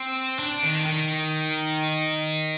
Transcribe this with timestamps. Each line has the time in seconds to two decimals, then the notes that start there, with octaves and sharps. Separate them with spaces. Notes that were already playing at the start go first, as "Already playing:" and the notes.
Already playing: C4
0.39 D4
0.63 D#3
0.86 D#3